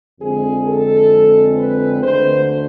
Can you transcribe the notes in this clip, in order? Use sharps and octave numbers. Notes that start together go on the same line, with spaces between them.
F2 D3 G#3 C4 G#4
A4
B4
D2 D3 A3 C5